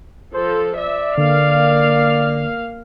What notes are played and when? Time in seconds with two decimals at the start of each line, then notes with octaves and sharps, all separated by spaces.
0.34 F3 A4 C5
0.76 D5 E5
1.18 D3 A#3 F5